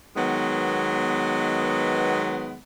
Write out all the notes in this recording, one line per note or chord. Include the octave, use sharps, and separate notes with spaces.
D#3 F#3 G#3 B3